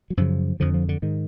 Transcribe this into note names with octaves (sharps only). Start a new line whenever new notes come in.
F#3
F#2 C#3 F3
F2 D3 F3
F3
D3
G#2 D#3